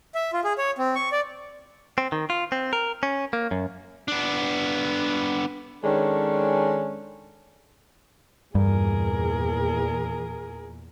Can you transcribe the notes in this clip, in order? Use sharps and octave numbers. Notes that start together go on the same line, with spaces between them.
E5
F4
G#4
C#5
C4
C#6
D5
C4
D#3
F4
C4
A#4
C#4
A#3
F#2
B3 D4
D#3 G#3 C#4 D4 A4 C#5
E2 G2 A#2 G#4 A#4